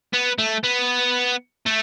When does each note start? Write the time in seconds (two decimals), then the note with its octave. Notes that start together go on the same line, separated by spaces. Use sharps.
0.13 B3
0.39 A3
0.64 B3
1.66 A3